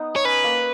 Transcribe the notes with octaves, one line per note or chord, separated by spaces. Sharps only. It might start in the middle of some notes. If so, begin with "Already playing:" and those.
Already playing: B3 D#4
C#5
C#4 B4
A#3